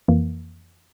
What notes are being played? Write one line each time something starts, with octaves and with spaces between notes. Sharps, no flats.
F2 E3 A#3